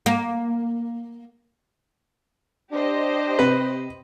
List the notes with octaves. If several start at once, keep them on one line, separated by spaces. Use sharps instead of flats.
A#3
D4 G4 C5 D#5
C3 B4